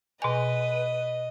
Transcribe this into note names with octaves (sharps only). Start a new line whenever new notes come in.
B2 B4 D#5 G#5